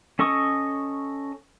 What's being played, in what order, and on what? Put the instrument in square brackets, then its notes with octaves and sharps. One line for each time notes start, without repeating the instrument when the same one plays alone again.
[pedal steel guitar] C#4 A4 D#5 C#6 D#6